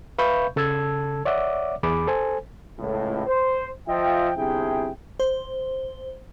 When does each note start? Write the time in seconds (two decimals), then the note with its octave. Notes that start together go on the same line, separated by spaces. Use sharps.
0.19 B4 E5 F5 B5 C#6 G6
0.56 C#3 A4 A5 E6 G#6
1.25 C#5 D5 E5 F#5 D6
1.83 E2 G#4 B5 D6
2.07 A4 C5 G#5
2.80 C#2 A2
3.26 C5
3.88 F3 F4 D#5 E5 G5
4.37 G1 C3 E4 G#4 G5
5.20 C5